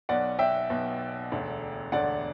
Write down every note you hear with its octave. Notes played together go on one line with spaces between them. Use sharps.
B1 B2 D5 F#5
E5 G5
B1 B2
E1 D2 D3
E1 D2 D3 D5 F#5